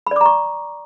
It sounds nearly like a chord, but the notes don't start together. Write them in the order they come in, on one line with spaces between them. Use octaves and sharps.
B5 D5 D6 A#5 C#6